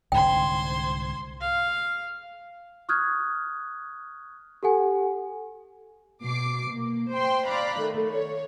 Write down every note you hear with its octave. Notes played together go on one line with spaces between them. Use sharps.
C2 G#2 D3 C5 G5 C6 G#6
F5
C#6 D#6 F6 F#6 G#6
G4 A4 F#5 G#5
B2 D6 C7
A#3
C5 G5 C6
D5 F5 A#5 B5 F#6
D#3 A3
C#5